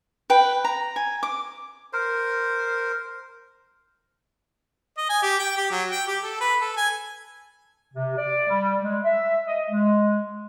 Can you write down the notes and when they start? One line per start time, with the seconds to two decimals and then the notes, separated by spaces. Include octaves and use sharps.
0.30 B4 G5
0.64 A#5
0.96 G#5
1.23 D6
1.93 A#4 C5
4.97 D#5
5.10 G#5
5.22 G4
5.39 G5
5.57 G4
5.71 F#3
5.90 G5
6.07 G4
6.23 A4
6.40 B4
6.61 A4
6.76 G#5
7.94 C3
8.17 D5
8.48 G3
8.82 G#3
9.04 E5
9.47 D#5
9.70 G#3